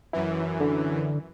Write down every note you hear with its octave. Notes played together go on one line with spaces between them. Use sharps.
F#2 E3 E4
D3